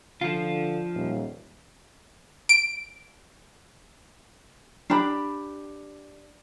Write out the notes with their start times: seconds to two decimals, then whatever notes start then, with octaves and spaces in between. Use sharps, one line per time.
0.21 D3 F3 F4
0.96 D#1
2.49 D7
4.90 D4 G4 B5